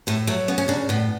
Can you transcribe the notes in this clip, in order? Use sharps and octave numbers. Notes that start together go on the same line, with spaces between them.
A2 A3
F#3 A3
C#3 B3
C#4
C#3 D4
A2 B3